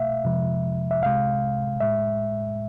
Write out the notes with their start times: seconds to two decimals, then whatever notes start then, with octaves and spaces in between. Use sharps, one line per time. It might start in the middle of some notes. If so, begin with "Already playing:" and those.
Already playing: C2 B2 A3 E5 F5
0.24 F2 C3 F3 G#3
0.91 E5
1.02 C2 C3 G#3 F5
1.80 A2 G#3 E5